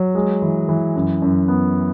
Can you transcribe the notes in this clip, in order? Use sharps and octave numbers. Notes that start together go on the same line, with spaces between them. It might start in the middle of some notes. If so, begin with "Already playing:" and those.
Already playing: F#3
G#3
E3
E3
F#2
F#2
B3